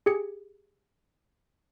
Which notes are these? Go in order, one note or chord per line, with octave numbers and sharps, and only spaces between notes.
G4 G#4 G#6 C#7